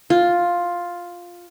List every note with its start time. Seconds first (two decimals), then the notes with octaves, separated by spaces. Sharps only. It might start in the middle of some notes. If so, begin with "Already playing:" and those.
0.10 F4